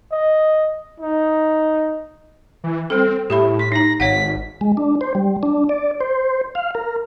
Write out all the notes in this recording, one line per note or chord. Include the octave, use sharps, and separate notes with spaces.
D#5
D#4
E3
G3 C4 A4
A2 G4 E5 B5
C6 B6
D#4 A#5 A#6
G#1 C#5 F5 F#5 B6
G#3
D4
C5
G3
D4
D5
C5
F5
A#4